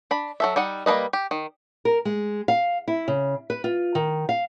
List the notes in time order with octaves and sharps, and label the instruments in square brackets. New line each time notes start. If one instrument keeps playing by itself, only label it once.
[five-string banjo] D4 B5
F#3 A4 E5
G3 D#4 F#5
G3 A#3 A4 B4 D#5
G4
D#3
[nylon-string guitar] A#4
G#3
F5
E4
C#3
B4
F4
D#3
F5